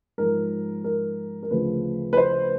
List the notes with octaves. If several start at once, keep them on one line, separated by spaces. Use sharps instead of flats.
G#2 F3 A#4
A#4
A#4
D2 C#3 F3 B4
B4
C5